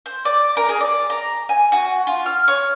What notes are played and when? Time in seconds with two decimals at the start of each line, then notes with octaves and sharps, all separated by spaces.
0.06 C5
0.25 D5
0.57 A#4
0.69 G#4
0.81 D5
1.10 A#5
1.49 G#5
1.72 F#4
2.07 F4
2.26 F6
2.48 C#5